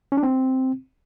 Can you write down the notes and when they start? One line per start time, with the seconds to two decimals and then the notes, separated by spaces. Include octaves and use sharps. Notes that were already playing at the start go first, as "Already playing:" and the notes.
0.12 C#4
0.17 D4
0.23 C4